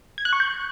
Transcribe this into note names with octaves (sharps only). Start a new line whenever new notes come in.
G#6
F#6
C#6
G6